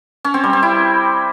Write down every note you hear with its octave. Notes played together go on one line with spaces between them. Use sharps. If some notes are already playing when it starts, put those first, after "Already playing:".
C#4
C4
G3
C4
E4